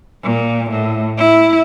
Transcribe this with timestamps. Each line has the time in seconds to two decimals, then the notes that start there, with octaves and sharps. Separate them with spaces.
0.23 A#2
0.70 A2
1.18 E4